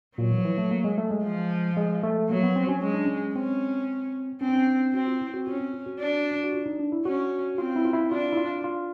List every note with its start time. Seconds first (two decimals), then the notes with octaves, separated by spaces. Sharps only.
0.18 A#2 F#3
0.31 E3
0.38 F3
0.45 E3
0.58 A3
0.71 A#3
0.84 G#3
0.98 A3
1.11 G#3
1.24 F3
1.77 G#3
2.03 A3
2.29 F#3 A#3
2.43 B3
2.56 C4
2.69 C#4
2.82 G#3 C#4
2.94 D4
3.05 C#4
3.35 C4 C#4
4.41 C4 C#4
4.49 D4
4.56 C#4
4.67 D4
4.94 C4 F#4
5.08 F4
5.20 E4
5.34 F#4
5.47 C#4 F4
5.60 C4
5.73 F4
5.86 F#4
5.99 D4
6.44 F#4
6.52 F4
6.66 D#4
6.79 D4
6.92 E4
7.05 C#4 F#4
7.58 C4 F4
7.76 E4
7.85 F4
7.93 E4
8.11 D4 F4
8.32 E4
8.37 F4
8.64 F4